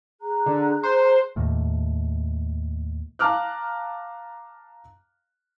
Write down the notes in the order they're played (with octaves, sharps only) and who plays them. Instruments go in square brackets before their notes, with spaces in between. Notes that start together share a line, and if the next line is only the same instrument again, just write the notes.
[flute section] G#4 A#5 F#6
[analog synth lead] D3
C5
[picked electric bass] D#2 A2
[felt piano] F5 A5 A#5 D6 F6 F#6